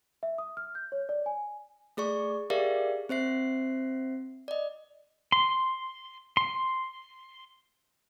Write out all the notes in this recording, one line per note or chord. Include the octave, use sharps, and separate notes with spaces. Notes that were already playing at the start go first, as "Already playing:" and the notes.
E5
D#6
F6
G6
C#5
D5
G#5
A3 G#4 D5 C#6
G4 G#4 A#4 D5 E5 F5
C4 C5 E5 C7
D5 D#5
C6
C6